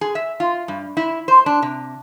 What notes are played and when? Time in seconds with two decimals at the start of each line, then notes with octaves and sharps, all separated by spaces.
0.01 G#4
0.15 E5
0.40 F4
0.68 G2
0.97 E4
1.28 C5
1.46 D4
1.62 C3